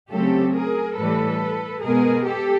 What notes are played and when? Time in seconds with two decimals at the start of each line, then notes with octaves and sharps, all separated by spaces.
0.11 C#3 F#3 A3 C4 G4 A4
0.55 G#4 A#4
0.97 A2 E3 G3 A4 B4
1.84 B2 G#3 B3 G#4 A#4
2.27 G4 A4